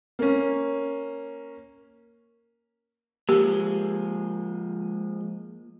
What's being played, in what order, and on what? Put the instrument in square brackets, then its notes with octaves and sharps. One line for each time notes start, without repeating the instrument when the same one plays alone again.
[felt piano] A#3 C#4
[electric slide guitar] F3 G#3 [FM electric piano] A#3 [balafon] G4